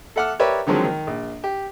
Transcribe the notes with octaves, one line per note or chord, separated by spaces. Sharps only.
A4 E5 F#5 D6 F6
G4 A#4 B4 C#5 D5 E5
D3 D#3 F3 F#3 G#3 C4
D#3
A#1
G4